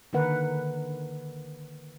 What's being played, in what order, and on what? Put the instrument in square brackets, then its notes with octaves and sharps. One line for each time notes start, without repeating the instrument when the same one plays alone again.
[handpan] D3 D#3 A#3 A#4 B4 F#5